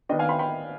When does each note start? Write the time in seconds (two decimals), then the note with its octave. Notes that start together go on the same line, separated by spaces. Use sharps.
0.09 D#3 B3 D4 D#5 G5
0.19 F5 G#5
0.29 G5 B5
0.39 G5 B5